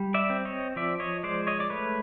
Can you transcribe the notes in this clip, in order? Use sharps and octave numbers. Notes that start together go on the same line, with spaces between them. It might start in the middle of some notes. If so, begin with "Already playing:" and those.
Already playing: G3
D5 E5
C4
C#5 D#5
F3 D5 E5
C#5 D#5
G#3 C5 D5
C#5 D#5
D5
A3 B4 C#5